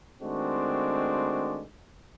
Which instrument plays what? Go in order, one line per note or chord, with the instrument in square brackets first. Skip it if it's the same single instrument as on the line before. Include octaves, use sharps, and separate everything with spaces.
[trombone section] D#3 G#3 A3 C4 D4 F#4